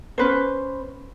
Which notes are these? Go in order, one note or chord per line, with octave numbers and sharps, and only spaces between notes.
C#4 B4 C5